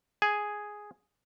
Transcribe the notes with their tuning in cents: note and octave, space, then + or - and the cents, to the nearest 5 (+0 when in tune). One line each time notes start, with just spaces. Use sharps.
G#4 +0 G#5 +0